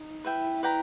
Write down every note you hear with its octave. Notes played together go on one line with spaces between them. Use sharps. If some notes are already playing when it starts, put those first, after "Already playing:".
Already playing: D#4
E4 B4 E5 G5
B4 D5 G5 A#5